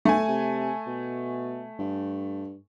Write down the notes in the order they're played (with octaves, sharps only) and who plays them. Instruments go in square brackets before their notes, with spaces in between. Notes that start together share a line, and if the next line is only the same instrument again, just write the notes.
[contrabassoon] B1 [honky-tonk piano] A3 G#5
[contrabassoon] C3
B2
G2